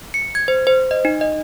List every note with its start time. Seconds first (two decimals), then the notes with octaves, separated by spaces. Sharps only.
0.14 C#7
0.35 G#6
0.48 C5
0.67 C5
0.91 D#5
1.05 D#4
1.21 D#5